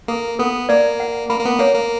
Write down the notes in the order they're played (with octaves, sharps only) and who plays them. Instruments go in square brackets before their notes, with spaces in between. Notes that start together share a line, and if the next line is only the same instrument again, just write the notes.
[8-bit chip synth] A#3 [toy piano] A4
[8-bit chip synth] B3 [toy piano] A4
[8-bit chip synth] A#3 [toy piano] D5
[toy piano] F#5
[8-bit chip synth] A#3 [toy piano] B5
[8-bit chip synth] A#3
B3
[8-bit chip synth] A#3 [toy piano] C#5
[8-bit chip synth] A#3